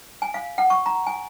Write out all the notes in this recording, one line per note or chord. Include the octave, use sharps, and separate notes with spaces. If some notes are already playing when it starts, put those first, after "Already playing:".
G#5
F5
F#5
C#6
A#5
G#5